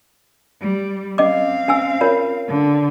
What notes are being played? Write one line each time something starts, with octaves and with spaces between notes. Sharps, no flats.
G3
C4 C#4 D#5 F5 D6
C#4 G#5 E6
F4 A#4 C#5
D3